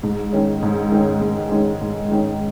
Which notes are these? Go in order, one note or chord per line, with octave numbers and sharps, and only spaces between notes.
G#2
D#3 G#3 C#4
G#2
D#3 G#3 C#4
G#2
D#3 G#3 C#4
G#2
D#3 G#3 C#4